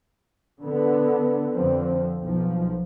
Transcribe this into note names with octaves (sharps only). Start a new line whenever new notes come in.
D3 B3
F2 D3 F3 C4
B1 F3